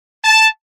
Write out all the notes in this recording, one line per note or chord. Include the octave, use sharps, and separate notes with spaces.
A5